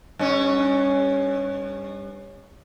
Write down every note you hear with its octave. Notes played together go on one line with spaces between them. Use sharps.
G2 C#4